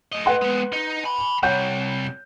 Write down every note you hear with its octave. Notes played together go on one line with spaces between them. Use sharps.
A3 D#5
B4 F#5 C6
G#3 B3
D#4
G#5 B5
C3 G3 C#5 F#5 G6